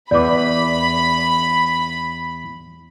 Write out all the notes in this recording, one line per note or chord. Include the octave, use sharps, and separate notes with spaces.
E2 B4 D5 B5 D6